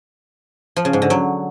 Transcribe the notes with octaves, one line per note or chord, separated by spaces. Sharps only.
F3
C#3
G#2
D3
F#3